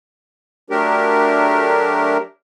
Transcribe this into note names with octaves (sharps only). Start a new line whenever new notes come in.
F#3 A3 D4 G4 A#4